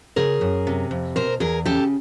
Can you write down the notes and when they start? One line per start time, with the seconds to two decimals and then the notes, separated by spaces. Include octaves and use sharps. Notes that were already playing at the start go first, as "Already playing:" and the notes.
0.16 C#3 G#4 A#4
0.41 F#2
0.67 C3
0.91 F2
1.16 B2 A#4 C5
1.40 E2 G#4 A#4
1.65 C#3 G4 A4